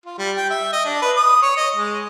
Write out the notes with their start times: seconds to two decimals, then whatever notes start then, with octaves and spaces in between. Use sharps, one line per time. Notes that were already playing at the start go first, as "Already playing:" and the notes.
0.06 F4
0.18 G3
0.36 G5
0.50 E5
0.72 D#5
0.85 D4
1.02 B4
1.16 D#6
1.42 C#5
1.57 D#5
1.76 G#3